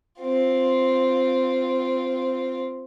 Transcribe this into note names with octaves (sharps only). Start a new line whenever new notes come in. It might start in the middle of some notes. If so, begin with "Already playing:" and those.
C4 F4